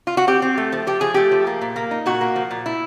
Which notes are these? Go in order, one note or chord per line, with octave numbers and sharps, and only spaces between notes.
F4
F#4
C4 G4
C4
A3
F3
F3 G4
F3 G#4
A3 G4
F3
A#3
A#2
A#3
D#4
A#2 F#4
A#3
F3
A#2
E4